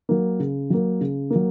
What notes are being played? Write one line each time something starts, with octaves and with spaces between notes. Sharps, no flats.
F#3 A#3
C#3
F#3 A#3
C#3
A#3
F#3